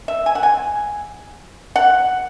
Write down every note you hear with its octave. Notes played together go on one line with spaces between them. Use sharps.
E5
G#5
F#5
G#5
F#5